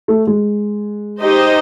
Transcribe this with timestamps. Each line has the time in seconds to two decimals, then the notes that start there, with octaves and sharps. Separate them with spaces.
0.08 A3
0.27 G#3
1.20 D#4 G4 C5 D#5